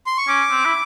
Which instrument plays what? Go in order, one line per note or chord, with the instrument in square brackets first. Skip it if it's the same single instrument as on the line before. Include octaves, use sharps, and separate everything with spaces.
[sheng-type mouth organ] C6
C#6
[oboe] C#4 [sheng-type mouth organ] D6
[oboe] C4
E4